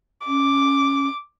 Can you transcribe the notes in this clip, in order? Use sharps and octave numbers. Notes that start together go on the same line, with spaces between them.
C#4 D6